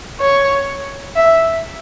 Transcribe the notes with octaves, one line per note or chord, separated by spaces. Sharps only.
C#5
E5